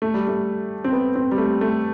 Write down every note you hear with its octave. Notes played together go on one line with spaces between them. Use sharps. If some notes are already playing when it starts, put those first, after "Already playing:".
A3
G3
A3
C4
B3
C4
G3
A3
A3